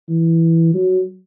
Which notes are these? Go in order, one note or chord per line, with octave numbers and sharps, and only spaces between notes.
E3
F#3